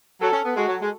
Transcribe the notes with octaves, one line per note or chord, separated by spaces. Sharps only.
F#3 A4
C#4
B3
G#3 F#4
F#3
G#3